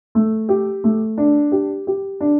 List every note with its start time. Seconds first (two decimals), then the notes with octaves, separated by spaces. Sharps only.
0.15 A3
0.49 G4
0.84 A3
1.18 D4
1.52 G4
1.87 G4
2.20 D4